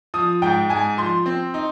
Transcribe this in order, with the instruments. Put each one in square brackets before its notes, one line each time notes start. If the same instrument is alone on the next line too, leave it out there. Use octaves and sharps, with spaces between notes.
[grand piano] F3 [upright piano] D#6
[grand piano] G#2 [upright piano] G5
[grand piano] G#2 [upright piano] G#5
[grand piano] F3 [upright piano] C6
[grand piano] C4
D#4